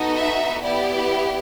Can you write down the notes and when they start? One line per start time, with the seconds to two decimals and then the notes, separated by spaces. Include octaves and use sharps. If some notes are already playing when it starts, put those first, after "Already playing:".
Already playing: B3 D#4 F#4 A4
0.18 E5
0.63 B3 E4 G4 D5